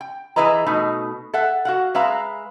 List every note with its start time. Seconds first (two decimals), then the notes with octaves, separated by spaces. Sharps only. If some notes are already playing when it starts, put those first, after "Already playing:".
0.01 G5
0.36 E3 E4 G#4 B4 D#5 A#5
0.66 B2 A3 D#4
1.34 A4 E5 F#5
1.65 F#4 F5 F#5
1.94 G#3 B4 E5 F5 A#5